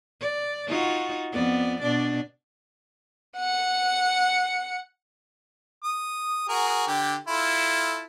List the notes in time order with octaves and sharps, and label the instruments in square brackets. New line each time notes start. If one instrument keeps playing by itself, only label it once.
[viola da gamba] D5
D#4 F4 F#4
F2 B3 D5
B2 D4 D5
[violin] F#5 C#7
[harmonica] D#6
F#4 G#4 A#4
D3 G4
E4 F4 A4